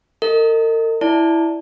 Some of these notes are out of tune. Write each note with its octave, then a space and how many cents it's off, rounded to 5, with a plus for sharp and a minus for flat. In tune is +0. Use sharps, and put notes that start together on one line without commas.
A#4 -45 D#5 +0
E4 +0 D5 +0 A5 +0